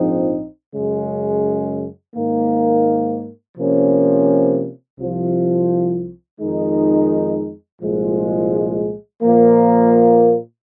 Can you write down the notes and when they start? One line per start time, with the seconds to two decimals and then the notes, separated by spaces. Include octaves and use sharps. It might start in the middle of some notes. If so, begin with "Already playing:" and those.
Already playing: A#1 G#2 F3 C4 D#4
0.73 F#2 C#3 G#3
2.15 G#2 D#3 A#3
3.56 C3 F3 A#3 C#4
4.98 C2 C3 F3
6.40 F2 D#3 G#3 D#4
7.82 C2 A#2 F3 G#3
9.23 A#2 F3 A#3